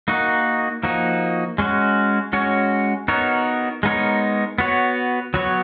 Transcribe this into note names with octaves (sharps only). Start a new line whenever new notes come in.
A#3 D#4 F#4
F3 A#3 D#4 F#4
G#3 C#4 F#4
G#3 C#4 F#4 C#5
B3 D#4 F#4 A#4 C#5
G#3 B3 D#4 A#4 C#5
B3 F#4 C#5
F#3 B3 F#4 C#5